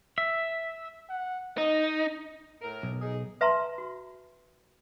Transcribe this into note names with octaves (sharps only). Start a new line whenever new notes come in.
E5
F#5
D#4 D#5
A2 A#4
B1
D#4 G#4
B4 E5 A5 A#5 C6
F#4